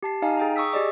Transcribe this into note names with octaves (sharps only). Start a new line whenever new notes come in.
G4 A5 C7
D#4 D#5 F5 G#5
G#4 G5 A#5
C#6 D#6 E6 B6
G4 G#4 D5 D#5 D6